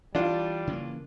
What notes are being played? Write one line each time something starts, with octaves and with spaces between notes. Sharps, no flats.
E3 G3 D4 F4
C#3 E3 A#3